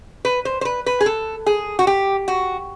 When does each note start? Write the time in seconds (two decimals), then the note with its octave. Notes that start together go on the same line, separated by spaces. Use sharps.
0.25 B4
0.45 C5
0.61 C5
0.65 B4
0.86 B4
1.01 G#4
1.06 A4
1.46 G#4
1.79 F#4
1.87 G4
2.28 F#4